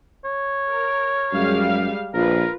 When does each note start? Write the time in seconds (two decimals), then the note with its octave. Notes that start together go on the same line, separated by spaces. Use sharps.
0.25 C#5
0.68 A#4
1.33 F#2 G3 G#3 F5
2.14 A#1 F4 A#4 B4